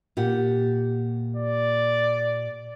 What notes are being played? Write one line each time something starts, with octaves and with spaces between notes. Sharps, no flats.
A#2 G4 F#5
D5